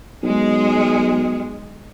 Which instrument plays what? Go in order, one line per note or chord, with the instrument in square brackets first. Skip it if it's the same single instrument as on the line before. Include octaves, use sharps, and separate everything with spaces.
[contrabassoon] B1 [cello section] G#3 G#4